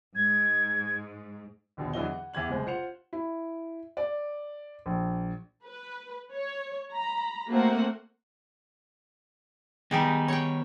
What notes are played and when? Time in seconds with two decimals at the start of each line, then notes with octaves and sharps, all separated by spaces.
0.15 G#2 G#6
1.77 A#1 D#2 B2 D3
1.93 E2 D3 E3 F#3 D#5 G7
2.11 F#5
2.34 E2 G4 G#6 F#7
2.48 F#1 C2 G#3 C5
2.66 F4 C5 F#5 C#7 F7
3.13 E4
3.97 D5
4.86 A#1
5.66 B4
6.34 C#5
6.92 A#5 B5
7.49 A3 A#3 C4 F#4 A#4 F#5
9.91 D#3 G3 B3 D#4 G4 G#4
10.28 C#5 G5